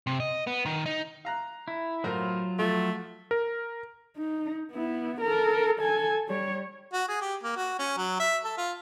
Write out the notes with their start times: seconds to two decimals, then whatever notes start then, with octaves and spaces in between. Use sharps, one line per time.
0.07 C3
0.20 D#5
0.47 B3
0.65 D#3
0.86 D#4
1.25 F5 A#5 F#6
1.68 E4
2.04 A2 F#3 F4 A#4 C5
2.59 F3 A3
3.31 A#4
4.17 D#4
4.72 B3 E4
5.21 A4 A#4
5.80 A4 G#5
6.28 G3 C#5
6.93 F#4
7.08 G#4
7.21 G4
7.43 A#3
7.56 F#4
7.79 C#4
7.97 F#3
8.19 E5
8.44 A4
8.58 F4